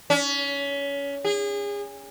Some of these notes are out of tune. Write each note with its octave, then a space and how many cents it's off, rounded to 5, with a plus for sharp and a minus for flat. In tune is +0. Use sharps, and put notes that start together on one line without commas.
C#4 +25
G#4 -30